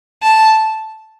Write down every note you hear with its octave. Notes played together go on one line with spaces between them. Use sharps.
A5